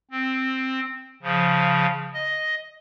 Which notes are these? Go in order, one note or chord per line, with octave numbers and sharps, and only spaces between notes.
C4
C#3 F3
D#5